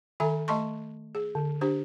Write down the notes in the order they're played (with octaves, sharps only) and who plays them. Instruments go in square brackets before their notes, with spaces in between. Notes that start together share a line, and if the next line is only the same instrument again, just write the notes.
[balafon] D#3 A4 E5 G#5 A#5
A3 D#5 A5 C6 C#6
G#4
D3
D4 G4 C5